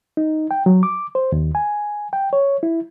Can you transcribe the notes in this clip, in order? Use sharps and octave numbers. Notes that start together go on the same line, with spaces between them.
D#4
G5
F#3
D6
C5
D#2
G#5
G5
C#5
E4